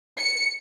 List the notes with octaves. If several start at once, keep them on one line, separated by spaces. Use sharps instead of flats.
C#7